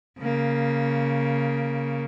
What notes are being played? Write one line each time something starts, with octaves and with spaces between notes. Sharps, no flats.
C#3 A#3